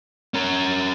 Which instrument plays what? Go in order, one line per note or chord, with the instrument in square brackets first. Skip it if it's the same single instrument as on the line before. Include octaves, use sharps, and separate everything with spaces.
[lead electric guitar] C#4 A#4